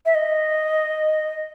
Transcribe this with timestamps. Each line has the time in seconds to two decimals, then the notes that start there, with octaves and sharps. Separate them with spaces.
0.06 E5
0.15 D#5